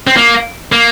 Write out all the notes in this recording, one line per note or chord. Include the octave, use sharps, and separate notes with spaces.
C4
A#3
A#3